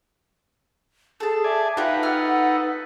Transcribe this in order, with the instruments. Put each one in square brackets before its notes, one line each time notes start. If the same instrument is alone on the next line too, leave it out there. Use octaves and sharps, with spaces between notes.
[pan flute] G#4 [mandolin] A4 A5
[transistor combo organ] D5 G#5 [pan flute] E5
[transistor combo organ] D#4 B4 [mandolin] F4 G4 [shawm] F#5
[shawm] A4 [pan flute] F#5 [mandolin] F6